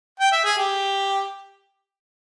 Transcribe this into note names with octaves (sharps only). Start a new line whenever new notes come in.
G5
E5
G#4
G4